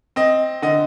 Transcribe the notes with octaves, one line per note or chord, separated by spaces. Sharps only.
C4 D#5
D3 D#5